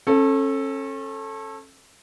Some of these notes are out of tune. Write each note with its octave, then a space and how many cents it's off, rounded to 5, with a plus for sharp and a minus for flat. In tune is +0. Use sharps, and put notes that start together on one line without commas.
C#4 -35 A4 +0